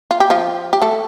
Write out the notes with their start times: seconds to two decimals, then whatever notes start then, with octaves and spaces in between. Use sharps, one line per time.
0.11 F4
0.20 G4
0.30 F3 F4
0.73 G4
0.82 A3 A4